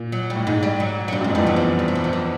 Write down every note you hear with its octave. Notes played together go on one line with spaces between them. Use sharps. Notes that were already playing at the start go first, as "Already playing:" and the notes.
Already playing: A#2
F#3
G3
A2
G#2 G#3
G3
F#3
F#3
G2 G3
F#2 G#3
F2
E2 G3
F#3
F3
G3
F#3
E3
F3
E3